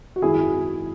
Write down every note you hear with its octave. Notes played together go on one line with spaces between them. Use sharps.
F#4
G#1 F#2 D#3 E4 G#4